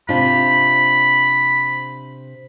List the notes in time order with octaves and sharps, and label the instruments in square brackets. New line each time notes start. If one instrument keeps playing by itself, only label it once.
[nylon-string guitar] C3 D4 F4 [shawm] B5